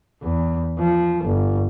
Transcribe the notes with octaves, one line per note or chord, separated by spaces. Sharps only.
E2
F3
G1